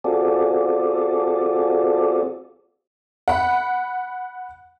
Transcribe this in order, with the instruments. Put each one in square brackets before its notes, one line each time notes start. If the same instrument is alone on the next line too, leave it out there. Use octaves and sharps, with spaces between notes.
[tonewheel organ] C4 F4 F#4 G#4 A4 D5
[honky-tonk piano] F#5 B5